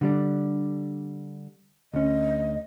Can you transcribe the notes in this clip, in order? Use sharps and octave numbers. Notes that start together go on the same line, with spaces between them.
D3 G3 D4
D2 C#4 D#5